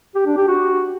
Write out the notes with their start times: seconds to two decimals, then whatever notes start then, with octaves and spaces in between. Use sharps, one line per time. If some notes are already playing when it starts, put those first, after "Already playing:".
0.15 G4
0.26 D4
0.37 G4
0.48 F#4